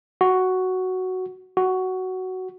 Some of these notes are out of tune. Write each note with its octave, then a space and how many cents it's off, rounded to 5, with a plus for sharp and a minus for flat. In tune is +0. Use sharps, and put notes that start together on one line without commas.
F#4 +5
F#4 +10